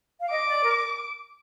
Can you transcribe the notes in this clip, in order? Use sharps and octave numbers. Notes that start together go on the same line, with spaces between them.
F5
D#5 D6
D5
A#4